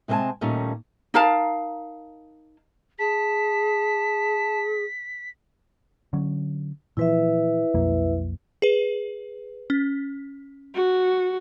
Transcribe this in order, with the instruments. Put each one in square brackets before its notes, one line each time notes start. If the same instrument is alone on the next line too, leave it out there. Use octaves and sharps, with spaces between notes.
[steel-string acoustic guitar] C3 G#3 C4 E5 G#5 A5
D#2 A#2 G3 A3 C#4 D#4
[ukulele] D#4 A#4 F5 A5
[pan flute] G#4 [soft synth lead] A5 [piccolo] B6
[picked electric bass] D3 F#3 C#4
[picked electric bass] A#2 E3 F3 [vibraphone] E4 B4 E5
[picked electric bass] B1 F2 A#3
[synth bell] G#4 B4
C#4
[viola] F#4